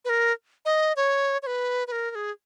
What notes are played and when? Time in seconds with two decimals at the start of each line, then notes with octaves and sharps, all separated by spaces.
0.05 B4
0.09 A#4
0.65 D#5
0.96 C#5
1.43 C#5
1.47 B4
1.87 B4
1.92 A#4
2.11 A#4
2.15 G#4